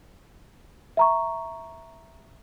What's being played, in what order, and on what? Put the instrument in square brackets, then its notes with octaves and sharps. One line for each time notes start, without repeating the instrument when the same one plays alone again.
[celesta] E5 A#5 C#6